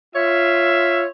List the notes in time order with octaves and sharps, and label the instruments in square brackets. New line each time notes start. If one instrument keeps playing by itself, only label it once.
[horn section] F4 C#5 E5